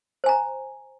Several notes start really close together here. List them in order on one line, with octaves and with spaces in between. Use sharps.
C5 G#5 A#5